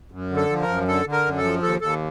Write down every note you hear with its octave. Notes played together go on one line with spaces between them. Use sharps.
F#2
D3
A4
F3
A#4
F#2
D3 A4
D3
A#4
F#2
A4
F3
D#2 A4
D#2 A4